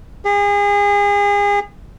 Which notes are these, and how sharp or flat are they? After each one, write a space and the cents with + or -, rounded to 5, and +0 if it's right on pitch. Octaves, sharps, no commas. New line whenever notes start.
G#4 -35